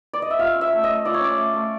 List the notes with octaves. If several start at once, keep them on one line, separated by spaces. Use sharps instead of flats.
D5
D#5
E5
F4 F5
C#4
E5
A3
D#5
A3
F4 D5
C#5
C#4 D5
A3
A3